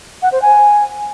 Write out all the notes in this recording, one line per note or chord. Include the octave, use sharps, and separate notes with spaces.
F#5
C5
G#5